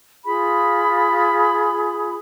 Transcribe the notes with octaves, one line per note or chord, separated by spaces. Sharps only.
F4 G#4 B5